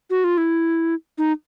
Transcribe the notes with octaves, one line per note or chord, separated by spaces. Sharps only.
F#4
F4
E4
D#4